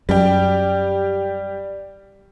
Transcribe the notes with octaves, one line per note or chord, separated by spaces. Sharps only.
F#2 G3 G4